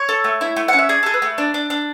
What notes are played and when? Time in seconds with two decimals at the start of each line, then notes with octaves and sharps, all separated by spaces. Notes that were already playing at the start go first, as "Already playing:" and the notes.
Already playing: C#5
0.09 A4
0.24 A3
0.41 E4
0.56 A3
0.68 C#4 F#5
0.78 E5
0.89 G#4 D5
1.03 G#4 A4
1.14 B4
1.22 A3
1.38 D4
1.54 D4
1.70 D4